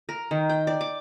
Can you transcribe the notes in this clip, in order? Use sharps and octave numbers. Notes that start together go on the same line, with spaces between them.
A#4
D#3
G5
D5
D6